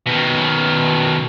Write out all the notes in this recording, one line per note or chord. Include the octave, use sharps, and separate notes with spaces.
B2 D#3